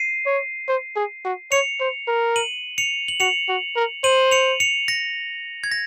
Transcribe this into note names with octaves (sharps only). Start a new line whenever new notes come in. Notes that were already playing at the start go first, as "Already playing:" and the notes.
Already playing: C7 D#7
C#5
C5
G#4
F#4
C#5 C#7 F7
C5
A#4
D#7 F#7
C#7 F7
F#7
F#4 C#7 F7
F#4
A#4
C5 D#7 F#7
C#7 F7
C#7 F7
A#6 C#7
G#6
A#6